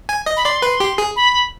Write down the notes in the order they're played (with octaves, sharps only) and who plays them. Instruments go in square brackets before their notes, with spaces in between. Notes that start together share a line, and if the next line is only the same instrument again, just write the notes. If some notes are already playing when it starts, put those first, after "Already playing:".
[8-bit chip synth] G#5
D#5
[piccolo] B5
[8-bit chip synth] D5 [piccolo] C6
[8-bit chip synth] B4
G4
G#4
[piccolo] B5